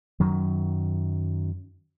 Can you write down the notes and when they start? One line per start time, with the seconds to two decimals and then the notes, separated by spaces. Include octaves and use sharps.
0.20 F#2 D#3 F#3